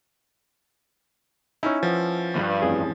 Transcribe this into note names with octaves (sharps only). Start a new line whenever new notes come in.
C#4 D#4 E4 G#5 E6
F3 B4 F#5
D2 G2
A1 F2 A2 G#4